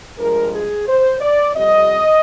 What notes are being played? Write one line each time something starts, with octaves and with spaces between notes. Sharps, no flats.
G2 F3 G#3 A#4
G#4
C5
D5
F2 C3 G3 D#5